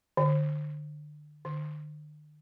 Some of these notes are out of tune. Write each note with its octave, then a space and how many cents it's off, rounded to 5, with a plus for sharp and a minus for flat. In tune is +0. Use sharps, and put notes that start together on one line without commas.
D3 +30
D3 +45